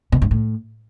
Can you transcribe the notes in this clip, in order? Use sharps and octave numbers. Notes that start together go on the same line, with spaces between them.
B2
G2
A2